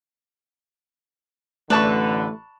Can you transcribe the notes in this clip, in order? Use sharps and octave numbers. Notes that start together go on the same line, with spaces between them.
A1 D3 A3 B4 D5 A5 C#6